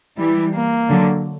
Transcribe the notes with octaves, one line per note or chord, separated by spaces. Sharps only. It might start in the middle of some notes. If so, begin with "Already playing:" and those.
E3 G3 E4
A#3
D3 F#3